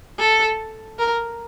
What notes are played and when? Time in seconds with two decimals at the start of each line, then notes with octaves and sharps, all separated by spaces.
0.19 A4
0.99 A#4